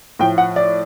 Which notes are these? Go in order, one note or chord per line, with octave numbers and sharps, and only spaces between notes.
A2 F3 G5
F#5
D5